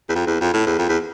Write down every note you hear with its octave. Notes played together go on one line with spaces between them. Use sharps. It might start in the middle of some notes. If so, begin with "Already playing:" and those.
E2
F2
E2
F2
A2
E2
F2
E2